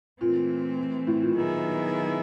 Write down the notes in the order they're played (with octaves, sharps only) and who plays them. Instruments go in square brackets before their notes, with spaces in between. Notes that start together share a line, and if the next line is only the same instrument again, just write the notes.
[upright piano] A#2 [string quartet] E3 A3 C4
[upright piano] A2
A#2
[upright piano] A#2 [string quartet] D#3 F#3 B3 E4 G#4